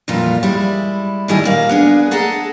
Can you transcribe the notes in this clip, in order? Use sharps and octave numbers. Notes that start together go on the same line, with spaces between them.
F2 A#2 E3 G3 F4
G3 G#3 E4
A2 D#3 G3 E4 D#5 G#5
A#2 A#3 F5
B3 D4 G#4
G#4 A4 D#5 F#5 A5 A#5